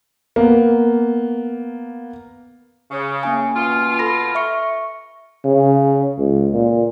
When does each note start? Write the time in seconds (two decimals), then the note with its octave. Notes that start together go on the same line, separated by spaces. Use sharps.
0.36 A#3 B3
2.91 C#3
3.23 A#3 C#4 G#5
3.54 B2 F4
3.99 A4 B5 A#6
4.35 E5 C#6 C#7
5.45 C#3
6.19 C#2
6.54 A#2